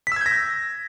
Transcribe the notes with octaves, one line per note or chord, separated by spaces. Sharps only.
E6 G6 G#6 A#6 B6